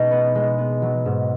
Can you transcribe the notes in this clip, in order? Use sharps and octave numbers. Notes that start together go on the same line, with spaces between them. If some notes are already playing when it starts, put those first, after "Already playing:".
Already playing: B2 G#3 D#4
B3
G#3
B3
F#3
G#2